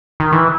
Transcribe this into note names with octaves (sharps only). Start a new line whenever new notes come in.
D#3
E3